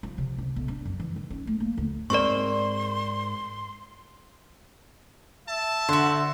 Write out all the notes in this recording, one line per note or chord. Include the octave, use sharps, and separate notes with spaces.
F3
C3
C2
B1
D4
F#2
E3
D#3
C#4
A3
A#3
D2
G#2 C4 A#4 D5 C6 C#6
E5 A5
D3 F#4 C5